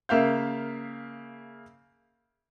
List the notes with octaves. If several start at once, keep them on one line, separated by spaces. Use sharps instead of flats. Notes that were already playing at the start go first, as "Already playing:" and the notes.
C#3 A#3 E5 F5 G6